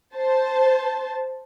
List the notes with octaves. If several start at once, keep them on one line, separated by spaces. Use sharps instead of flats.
C5 A5